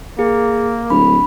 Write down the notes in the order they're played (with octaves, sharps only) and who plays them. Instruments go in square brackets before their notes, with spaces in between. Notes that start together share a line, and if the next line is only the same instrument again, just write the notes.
[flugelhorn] A#3 [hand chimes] G#4
[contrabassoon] D1 [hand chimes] B5